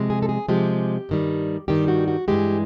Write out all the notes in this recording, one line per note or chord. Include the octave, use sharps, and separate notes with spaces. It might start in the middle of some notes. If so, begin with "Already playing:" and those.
Already playing: C3 F3 G#3
G#4
A4
G#4
C3 F3 G#3 G4
G2 D#3 G3
G2 D#3 G3 G4
F#4
F#4
G2 E3 G#3 G4